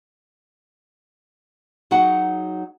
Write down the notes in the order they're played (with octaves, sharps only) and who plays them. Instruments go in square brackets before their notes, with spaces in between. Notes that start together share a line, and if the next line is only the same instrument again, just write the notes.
[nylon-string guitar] F#3 D#4 F#4 G#4 F#5